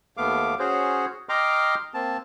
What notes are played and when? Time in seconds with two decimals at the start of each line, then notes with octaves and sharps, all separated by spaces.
0.17 D#2 A3 B3 F5 D6
0.59 C#4 F#4 G#4 C5 C#5
1.29 D#5 G5 A#5 C6 D6 F6
1.94 A#3 C4 A5